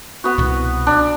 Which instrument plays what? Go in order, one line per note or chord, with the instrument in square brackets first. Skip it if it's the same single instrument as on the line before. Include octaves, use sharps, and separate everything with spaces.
[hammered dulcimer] B3 F#4
[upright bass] C2 B2
[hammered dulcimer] D4